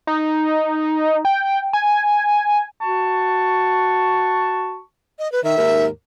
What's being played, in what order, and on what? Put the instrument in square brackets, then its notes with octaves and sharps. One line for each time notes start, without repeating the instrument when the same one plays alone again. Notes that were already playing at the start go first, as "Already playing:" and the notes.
[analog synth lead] D#4
G5
G#5
[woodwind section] F#4 A5 C#6
[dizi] D#5
B4
[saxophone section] D#3 [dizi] E5
[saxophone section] D#2 G#2 A#4